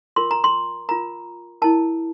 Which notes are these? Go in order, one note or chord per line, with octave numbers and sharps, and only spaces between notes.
F4 A#4 C6
A#5
C6
F4 A#4 A#5
E4 A#4 A5